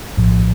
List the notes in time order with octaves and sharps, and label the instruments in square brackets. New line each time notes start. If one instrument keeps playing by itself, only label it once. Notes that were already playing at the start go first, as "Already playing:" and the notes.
[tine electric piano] A#1 A2 F3